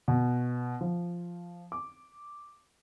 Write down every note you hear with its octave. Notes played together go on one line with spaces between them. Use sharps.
B2
F3
D6